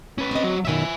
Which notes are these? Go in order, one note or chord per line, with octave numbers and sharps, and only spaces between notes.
C#4 B4
C4 D#5
F#3
F#2 B2 D#3 E5 G#5